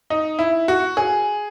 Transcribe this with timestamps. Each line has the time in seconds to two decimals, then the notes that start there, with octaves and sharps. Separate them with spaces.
0.10 D#4
0.39 E4
0.68 F#4
0.97 G#4